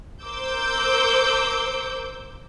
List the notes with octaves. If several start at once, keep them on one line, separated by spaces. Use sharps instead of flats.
A#4 C5 D6 E6 G6